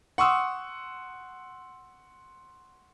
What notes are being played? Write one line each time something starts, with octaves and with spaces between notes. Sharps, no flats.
F#5 C6 C#6 D#6 E6